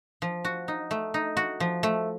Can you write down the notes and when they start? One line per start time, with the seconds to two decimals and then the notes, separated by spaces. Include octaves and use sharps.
0.22 F3
0.45 F#4
0.68 D#4
0.91 A3
1.14 D#4
1.37 F#4
1.60 F3
1.83 A3